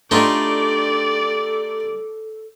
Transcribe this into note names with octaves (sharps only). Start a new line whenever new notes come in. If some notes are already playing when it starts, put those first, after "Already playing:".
G3 A3 D4 D#4 F4 A4 D5